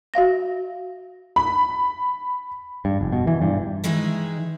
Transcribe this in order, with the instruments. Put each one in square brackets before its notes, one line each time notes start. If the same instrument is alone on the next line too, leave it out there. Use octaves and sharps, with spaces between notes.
[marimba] F#4 E5 F5 A#6
[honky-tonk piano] B5
[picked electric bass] G2
F1
B2
E3
G2
[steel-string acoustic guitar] D#3 E3 G#3 D#4 E4 G#4